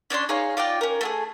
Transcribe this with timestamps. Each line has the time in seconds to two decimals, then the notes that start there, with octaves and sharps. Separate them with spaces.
0.10 C#4 D4 D5 C6
0.29 D#4 G#4 C#5 F5
0.57 F4 D5 D#5 G5
0.81 C#4 A#4
1.01 A3 F4 G#4